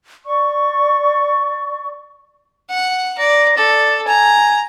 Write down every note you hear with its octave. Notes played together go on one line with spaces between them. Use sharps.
D5 C#6
F#5
D5 A#5
A4 D5
G#5 A#5